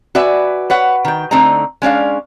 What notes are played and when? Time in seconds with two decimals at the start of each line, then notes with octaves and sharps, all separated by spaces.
0.15 F#4 B4 D5 E5 G#5
0.70 B4 C#5 F#5
1.05 D#3 G5
1.31 D3 A3 C4 D#4 A#5
1.82 G#3 C#4 D4 F5